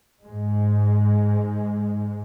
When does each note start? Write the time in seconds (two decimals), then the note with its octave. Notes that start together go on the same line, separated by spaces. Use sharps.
0.24 G#2 G#3